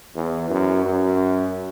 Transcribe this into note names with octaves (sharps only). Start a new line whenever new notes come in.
E2
F#2
F#2